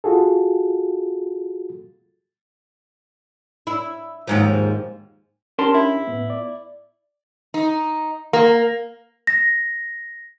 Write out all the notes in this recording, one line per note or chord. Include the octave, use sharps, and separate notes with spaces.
F4 F#4 G#4 A4
E4
D#2 G#2 F3
C#4 D4 G4 A#4 A5 C6
E4
A2 B3
D5
D#4
A#3
A#6